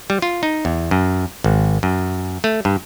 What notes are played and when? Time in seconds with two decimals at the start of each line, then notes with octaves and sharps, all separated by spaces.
0.10 G3
0.22 F4
0.43 D#4
0.65 E2
0.91 F#2
1.44 G#1
1.83 F#2
2.44 A3
2.65 G2